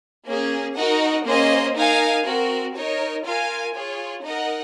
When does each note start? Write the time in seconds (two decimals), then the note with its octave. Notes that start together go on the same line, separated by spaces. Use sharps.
0.25 A#3 C#4 G#4
0.75 D#4 F#4 A#4 D#5 F#5
1.25 A#3 C#4 G#4 C5 D#5
1.74 D#4 A#4 F5 G#5
2.25 C4 F#4 A#4
2.75 D#4 A#4 C#5
3.25 F4 A#4 F5 G#5
3.74 F4 G#4 C#5
4.23 D#4 A#4 D#5 F#5